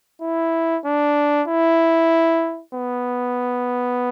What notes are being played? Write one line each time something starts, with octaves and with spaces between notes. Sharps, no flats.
E4
D4
E4
B3